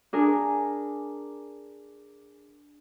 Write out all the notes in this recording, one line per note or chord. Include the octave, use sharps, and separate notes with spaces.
D4 G#4 A#4